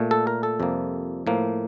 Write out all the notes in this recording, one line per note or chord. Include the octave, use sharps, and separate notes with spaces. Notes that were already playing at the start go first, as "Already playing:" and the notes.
Already playing: A#2 A3
A4
A#4
A4
F2 C3 G3 A#3
A2 F3 A#3